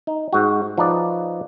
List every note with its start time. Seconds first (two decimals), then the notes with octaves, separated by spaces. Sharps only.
0.07 D#4
0.33 G#2 F#4
0.78 F3 D#4 B4 D5